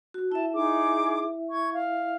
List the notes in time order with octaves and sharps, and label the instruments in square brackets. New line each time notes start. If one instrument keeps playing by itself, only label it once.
[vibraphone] F#4
[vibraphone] E4 E5 [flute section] A5
[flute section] D#4 G#4 D6
C#6 G#6
F5